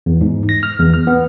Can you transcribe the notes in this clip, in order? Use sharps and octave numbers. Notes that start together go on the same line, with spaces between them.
E2
G#2
A#6
F6
E2
F6
B3